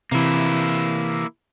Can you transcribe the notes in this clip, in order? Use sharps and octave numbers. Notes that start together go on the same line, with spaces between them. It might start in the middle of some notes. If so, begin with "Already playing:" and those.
C3 E3 A#3 E4